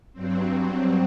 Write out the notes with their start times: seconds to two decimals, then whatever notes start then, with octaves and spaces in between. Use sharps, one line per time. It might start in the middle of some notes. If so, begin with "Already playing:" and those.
0.13 G2 F#3 C4